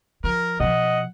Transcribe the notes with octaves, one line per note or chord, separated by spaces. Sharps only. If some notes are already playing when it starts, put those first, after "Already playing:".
F3 A#4
B2 F3 D#5 F#5